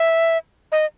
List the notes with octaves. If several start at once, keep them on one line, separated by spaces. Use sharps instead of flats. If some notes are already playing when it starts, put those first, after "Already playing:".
Already playing: E5
D#5